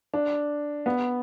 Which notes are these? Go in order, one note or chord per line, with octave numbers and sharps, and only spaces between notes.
D4
B3